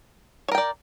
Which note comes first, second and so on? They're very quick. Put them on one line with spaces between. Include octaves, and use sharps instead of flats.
C#5 A#4 G5 D5